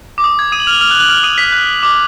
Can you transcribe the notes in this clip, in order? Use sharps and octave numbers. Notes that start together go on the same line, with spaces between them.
D6
D#6
G#6
D#6 D#7
F#7
F6 F7
F6 F7
F#6 F#7
F#6 F#7
F6 F7
D#6 D#7
B6
F#6
D6